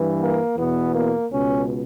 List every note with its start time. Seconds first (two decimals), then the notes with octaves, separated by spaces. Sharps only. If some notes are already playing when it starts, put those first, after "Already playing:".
Already playing: G2 E3
0.20 A#3
0.56 E2 B2 B3
0.93 A#3
1.30 C#2 B2 C#4